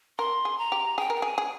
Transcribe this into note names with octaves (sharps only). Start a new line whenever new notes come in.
A#4 C6
G#4
A#5
G4
G#4 G5
A#4
G5
G#4 G#5
G#4